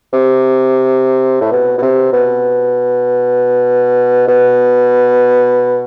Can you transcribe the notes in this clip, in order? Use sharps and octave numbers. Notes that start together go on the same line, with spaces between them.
C3
A2
B2
B2
C3
B2
B2